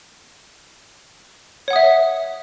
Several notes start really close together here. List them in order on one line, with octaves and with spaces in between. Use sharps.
C#5 F#5 D#6 E5